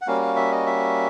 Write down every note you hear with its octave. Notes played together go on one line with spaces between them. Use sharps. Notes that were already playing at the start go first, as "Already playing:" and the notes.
F#5
G3 A#3 C#4 F#4 F5
F5
E5
D#5
E5